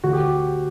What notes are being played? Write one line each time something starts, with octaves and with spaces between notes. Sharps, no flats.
D2 F#4
G4